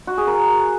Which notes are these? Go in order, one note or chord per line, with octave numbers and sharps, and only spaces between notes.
F#4
G#4
A#4